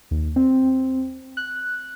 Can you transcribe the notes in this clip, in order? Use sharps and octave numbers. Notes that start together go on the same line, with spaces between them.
D#2
C4
F#6